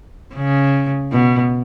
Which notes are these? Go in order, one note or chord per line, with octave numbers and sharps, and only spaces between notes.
C#3
B2